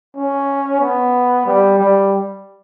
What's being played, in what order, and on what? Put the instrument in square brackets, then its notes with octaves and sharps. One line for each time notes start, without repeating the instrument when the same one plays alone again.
[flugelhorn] C#4
B3
G3
G3